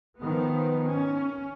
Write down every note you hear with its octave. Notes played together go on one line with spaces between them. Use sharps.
D#3 F3 B3
C#4